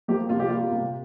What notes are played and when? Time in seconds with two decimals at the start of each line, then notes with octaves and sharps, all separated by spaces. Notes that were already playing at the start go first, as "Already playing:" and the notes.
0.08 F3 A#3 G4
0.29 C3 F4
0.39 G4
0.49 G3 A#3 F4
0.71 C3